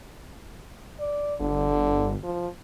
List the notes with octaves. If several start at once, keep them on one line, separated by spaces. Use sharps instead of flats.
D5
G1 D3
F3